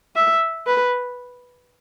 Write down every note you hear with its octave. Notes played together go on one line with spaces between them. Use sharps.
E5
B4